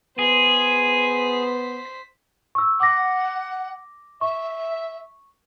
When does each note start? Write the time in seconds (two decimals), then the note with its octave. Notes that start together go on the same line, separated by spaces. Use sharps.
0.19 B3 G#4 C5 B6
2.55 C#6 E6
2.80 F#5 D6 A#6
4.21 E5 C#6